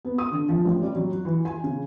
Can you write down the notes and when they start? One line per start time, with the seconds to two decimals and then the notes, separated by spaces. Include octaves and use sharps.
0.05 B3
0.18 D#6
0.32 D3
0.49 F3
0.65 A1
0.82 G3
0.95 F#3
1.12 F#4
1.25 E3
1.45 G#5
1.64 C#3